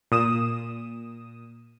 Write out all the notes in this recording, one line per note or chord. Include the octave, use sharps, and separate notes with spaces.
A#2 D#6 E7